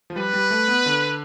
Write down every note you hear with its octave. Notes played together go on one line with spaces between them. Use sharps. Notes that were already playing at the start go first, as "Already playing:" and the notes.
F3
G3 B4
G3
A3
B3
D3